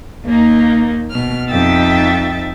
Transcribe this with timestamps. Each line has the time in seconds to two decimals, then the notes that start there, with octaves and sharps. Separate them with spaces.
0.24 D#2 A#3 D#4
1.10 B2 F6
1.49 F2 D#4 E5 G5 A6